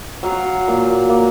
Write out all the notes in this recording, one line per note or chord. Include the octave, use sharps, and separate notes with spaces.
F#3 F#4 F5
A#2
A#3